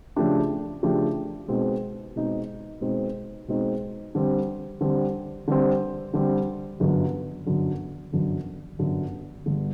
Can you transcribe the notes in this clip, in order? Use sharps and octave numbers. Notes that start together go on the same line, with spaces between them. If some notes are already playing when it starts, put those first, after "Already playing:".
C#3 F3 A3 D4 G4
C#3 F3 A3 D4 G4
B2 G#3 C4 D#4
B2 G#3 C4 D#4
B2 G#3 C4 D#4
B2 G#3 C4 D#4
D3 G3 C4
D3 G3 C4
D3 G3 C4
D3 G3 C4
G1 F#2 D3 F#3
G1 F#2 D3 F#3
G1 F#2 D3 F#3
G1 F#2 D3 F#3
G1 G2 D3